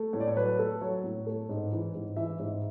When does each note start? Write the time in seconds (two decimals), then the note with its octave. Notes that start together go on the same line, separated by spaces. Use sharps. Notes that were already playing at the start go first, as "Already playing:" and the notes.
Already playing: A3
0.13 A2 C#5
0.20 D5
0.28 C#5
0.36 F#3 B4
0.59 A3 A4
0.81 F#3 C#5
1.04 A2
1.27 A3
1.49 G#2
1.72 E3
1.95 G#2
2.16 E3 E5
2.39 G#2